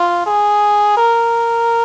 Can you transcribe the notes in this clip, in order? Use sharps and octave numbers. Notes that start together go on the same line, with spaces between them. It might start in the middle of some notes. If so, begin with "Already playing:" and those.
Already playing: F4
G#4
A#4